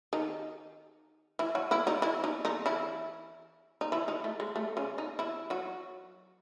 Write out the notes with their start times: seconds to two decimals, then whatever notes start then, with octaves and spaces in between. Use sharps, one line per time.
0.13 D#3 D#4
1.39 E3 E4
1.55 F#3 F#4
1.71 E3 E4
1.87 D#3 D#4
2.02 E3 E4
2.24 D#3 D#4
2.45 D#3 D#4
2.66 E3 E4
3.81 D#4
3.92 E3 E4
4.08 D#3 D#4
4.24 A3
4.40 G#3
4.56 A3
4.77 C#3 C#4
4.98 D#3 D#4
5.19 E3 E4
5.50 F#3 F#4